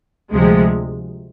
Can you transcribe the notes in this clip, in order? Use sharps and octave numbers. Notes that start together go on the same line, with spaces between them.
D2 C3 F3 G#3